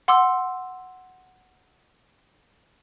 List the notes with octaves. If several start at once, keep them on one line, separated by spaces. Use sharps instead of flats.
F#5 C6 D6 E6